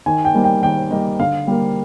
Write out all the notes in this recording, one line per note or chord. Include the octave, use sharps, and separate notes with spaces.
D#3 G#5
G5
G3 A#3 D#4
G5
D#3 G5
G3 A#3 D#4
D3 F5
G3 A#3